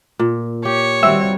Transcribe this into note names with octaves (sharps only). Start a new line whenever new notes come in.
A#2
G4 C#5
D#3 G3 C4 F#4 E5